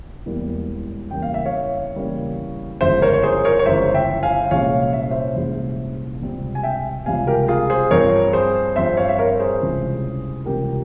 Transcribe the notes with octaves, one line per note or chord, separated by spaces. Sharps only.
E1 E2 E3 G3 A#3
E2 C#3 E3 G3 A#3 G5
F5
E5
C#5 F5
E2 C#3 E3 G3 A#3
G1 F2 C#3 E3 G#3 C5 E5
A#4 C#5
C#5
G#4 C5
A#4 C#5
C#5
G1 F2 C#3 E3 G#3 C5 E5
E5 G5
F5 G#5
C2 A#2 G#3 C#4 C#5 F5
E5
C#5
C5 E5
C2 A#2 G#3 C#4
C#2 C3 G3 C4
G#5
E5 G5
C#2 C3 G3 C4 F5 G#5
G4 A#4
F4 G#4
G#4 C5
G2 F3 C4 A#4 C#5
G#4 C5
G2 F3 C4 C5 E5
C#5 F5
E5
A#4 C#5
G#4 C5
C#2 C3 E3 G3 C#4
C#2 C3 E3 G3 C#4 G4 A#4